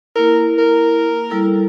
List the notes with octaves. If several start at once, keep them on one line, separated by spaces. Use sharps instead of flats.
A#3 E4 A#4
A#4
G3 E4 A4